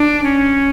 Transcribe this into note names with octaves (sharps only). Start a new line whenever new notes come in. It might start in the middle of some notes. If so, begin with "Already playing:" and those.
Already playing: D4
C#4